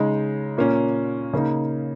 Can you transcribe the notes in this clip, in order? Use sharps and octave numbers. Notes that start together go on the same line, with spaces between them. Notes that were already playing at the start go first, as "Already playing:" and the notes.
Already playing: C#3 G#3 D#4
A#2 A#3 C#4
C#3 A#3 D#4